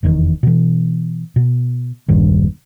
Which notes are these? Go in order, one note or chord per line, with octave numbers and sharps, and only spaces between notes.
F1 E2 B2 D#3
B2 E3
B2
E1 A#1 G2 D#3